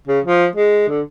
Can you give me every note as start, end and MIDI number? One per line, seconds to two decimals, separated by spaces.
0.07 0.19 49
0.24 0.45 53
0.55 0.86 56
0.88 1.01 50